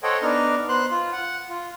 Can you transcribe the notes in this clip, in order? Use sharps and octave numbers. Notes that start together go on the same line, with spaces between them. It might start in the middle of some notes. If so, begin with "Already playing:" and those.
A4 C5 C#5 D#5 F#5 G5
B3 D4 D#4 F6
B3 C5 C6 F#6
F4
F#5
F4